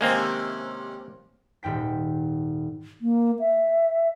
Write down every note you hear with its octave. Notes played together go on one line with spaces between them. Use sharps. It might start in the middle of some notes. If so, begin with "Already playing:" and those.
C3 D#3 G#3 A#3 C4 C#4
D#1 G#2 G5 B6
A#3
E5